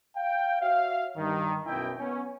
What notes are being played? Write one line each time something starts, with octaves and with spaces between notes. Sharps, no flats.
F5 G5
F#4 C#5 E5 F5
G2 D#3
B1 F#2 B2 E4 D#5 G5
B3 C#4